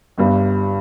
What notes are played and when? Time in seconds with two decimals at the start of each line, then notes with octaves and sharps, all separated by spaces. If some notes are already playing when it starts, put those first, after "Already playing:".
0.18 G1 G2 G3